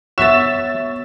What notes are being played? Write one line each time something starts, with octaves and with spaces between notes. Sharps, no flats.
B3 F#4 C#5 E5 E6 A6 E7